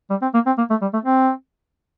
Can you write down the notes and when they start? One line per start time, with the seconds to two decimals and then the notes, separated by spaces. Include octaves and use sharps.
0.10 G3
0.22 C4
0.34 A#3
0.46 C4
0.58 A#3
0.70 A3
0.82 G3
0.93 A3
1.05 C4